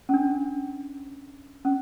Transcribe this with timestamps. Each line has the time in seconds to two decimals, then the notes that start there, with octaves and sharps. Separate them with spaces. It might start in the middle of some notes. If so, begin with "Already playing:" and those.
0.09 C#4
0.14 D4
1.65 C#4